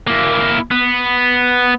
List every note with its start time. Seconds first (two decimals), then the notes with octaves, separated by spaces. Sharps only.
0.07 A#3 E4
0.71 B3